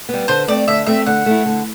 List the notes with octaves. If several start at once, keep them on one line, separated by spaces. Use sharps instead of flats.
G3 B3
D3 C5
A3 C4 D5
D3 E5
A3 C4 E5
D3 F#5
A3 E4
D3